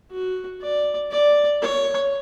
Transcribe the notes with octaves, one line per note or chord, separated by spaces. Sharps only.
F#4
D5
D5
C#5